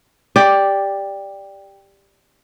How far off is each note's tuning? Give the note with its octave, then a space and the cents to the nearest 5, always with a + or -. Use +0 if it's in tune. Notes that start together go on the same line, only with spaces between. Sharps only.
G4 +10 D5 +0